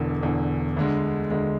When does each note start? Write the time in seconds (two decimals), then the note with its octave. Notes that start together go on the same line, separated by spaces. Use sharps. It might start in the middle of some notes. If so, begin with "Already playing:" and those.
Already playing: E1 E2 D3
0.23 E1 E2 D3
0.77 D2 D3 G#3
1.30 D2 D3 G#3